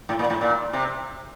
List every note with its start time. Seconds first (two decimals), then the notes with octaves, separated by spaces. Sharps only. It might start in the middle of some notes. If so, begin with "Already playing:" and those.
0.09 A2
0.19 A#2
0.30 A2
0.41 A#2
0.73 C3